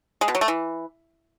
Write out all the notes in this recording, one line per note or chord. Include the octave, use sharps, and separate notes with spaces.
G#3
B2
F#3
A3
E3